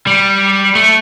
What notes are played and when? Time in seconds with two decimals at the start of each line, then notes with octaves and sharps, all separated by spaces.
0.07 G3
0.75 A3